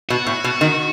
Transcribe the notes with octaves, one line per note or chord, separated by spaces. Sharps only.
B2 F#4
A2
B2
D#3